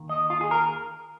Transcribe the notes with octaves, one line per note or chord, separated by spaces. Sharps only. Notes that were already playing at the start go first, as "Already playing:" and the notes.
Already playing: D#2 D#3
D#5
F4
G#4
A#4